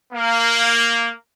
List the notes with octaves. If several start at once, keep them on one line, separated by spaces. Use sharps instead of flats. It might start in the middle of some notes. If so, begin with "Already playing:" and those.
A#3